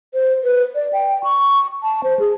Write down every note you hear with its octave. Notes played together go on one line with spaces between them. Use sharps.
C5
B4
D5
G5
C#6
A5
C5
G#4